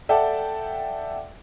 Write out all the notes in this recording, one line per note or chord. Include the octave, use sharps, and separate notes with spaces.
A4 D5 E5 F#5 G5 A5